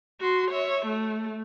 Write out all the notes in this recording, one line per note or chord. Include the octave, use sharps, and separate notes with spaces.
F#4 C6
C#5 E5
A3